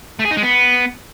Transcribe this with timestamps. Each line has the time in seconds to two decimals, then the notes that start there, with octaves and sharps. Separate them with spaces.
0.19 A3
0.25 G#4
0.31 D#4
0.37 G#3
0.43 B3